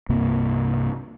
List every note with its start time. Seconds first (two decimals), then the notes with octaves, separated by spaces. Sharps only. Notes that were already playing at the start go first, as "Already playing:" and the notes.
0.09 C2 G2 C3 A#3